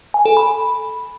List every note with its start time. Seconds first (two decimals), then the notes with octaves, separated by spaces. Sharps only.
0.14 G#5
0.25 A4
0.37 B5